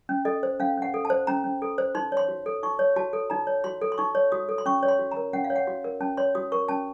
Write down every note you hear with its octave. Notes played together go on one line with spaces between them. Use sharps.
C#4
A4 D#5
C5
C#4 F5
C#4 F#5
A4
A5
C5
C#4 A#5
C#4
A4
C5
D#4 C6
C#5 C6
F#4
A4
D#4 C#6
C#5
F#4 A5
A4
D#4 A#5
C#5
F#4 C6
A4
C6
D#4 C#6
C#5
F#4 D#6
A4
C6
C#4 C#6
C#5
C6
F#4
A#5
A#4
C#4 F#5
F5
C#5
F#5
F#4
A#4
C#4 A5
C#5 C6
F#4 D#6
A#4 C#6
C#4 A5